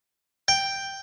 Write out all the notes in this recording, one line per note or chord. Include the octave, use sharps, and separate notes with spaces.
G5